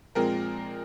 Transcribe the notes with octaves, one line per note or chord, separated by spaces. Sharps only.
A#2 F3 G#3 C4 A#4